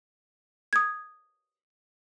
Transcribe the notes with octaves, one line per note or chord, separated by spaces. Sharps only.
D#6 G#6